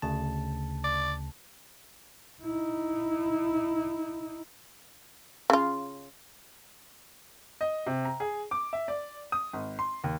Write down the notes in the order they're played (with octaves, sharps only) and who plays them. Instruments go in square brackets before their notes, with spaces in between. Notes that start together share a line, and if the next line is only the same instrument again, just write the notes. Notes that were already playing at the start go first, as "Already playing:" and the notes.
[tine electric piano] D2 C#3 A5
[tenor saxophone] D5
[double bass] D#4 E4
[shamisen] C#3 F4
[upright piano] D#5
C3
A#5
G#4
D6
E5
D5
D#6
G#1
C6
D#2